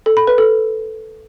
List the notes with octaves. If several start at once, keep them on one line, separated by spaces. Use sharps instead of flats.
A4
B5
B4
A4